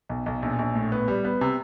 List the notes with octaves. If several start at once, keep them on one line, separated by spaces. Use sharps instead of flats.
B1
B1
A#1
A#1
A2
B3
G3
B3
C3